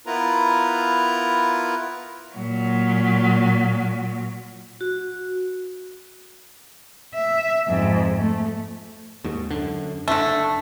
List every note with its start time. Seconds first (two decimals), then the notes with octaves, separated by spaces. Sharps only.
0.07 B3 E4 F4 A#4 B4 A#5
2.35 A#2 F#3
4.81 F#4
7.15 E5
7.68 F2 G#2
8.17 A3
9.24 D#2 G#2
9.51 F#2 D3
10.08 F#1 D3 A3 D4